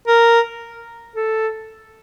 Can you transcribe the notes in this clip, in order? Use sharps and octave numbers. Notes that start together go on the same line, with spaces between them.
A#4
A4